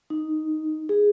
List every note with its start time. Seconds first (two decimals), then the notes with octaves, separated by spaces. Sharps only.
0.10 D#4
0.89 G#4